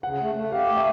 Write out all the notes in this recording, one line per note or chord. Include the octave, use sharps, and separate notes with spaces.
C#3 F#5
A3
A3
G4 F5
A3
E5